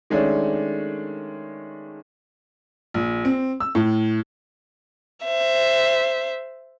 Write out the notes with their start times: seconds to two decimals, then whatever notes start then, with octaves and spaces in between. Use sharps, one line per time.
0.10 D#3 G#3 A3 C#4 D4
2.94 A#1
3.25 C4
3.60 E6
3.75 A2
5.24 C5 E5